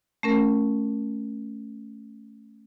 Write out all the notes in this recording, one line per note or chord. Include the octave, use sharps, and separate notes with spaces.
A3 C#4 A#4